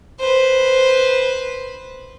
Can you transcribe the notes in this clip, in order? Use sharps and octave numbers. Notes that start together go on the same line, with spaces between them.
B4 C5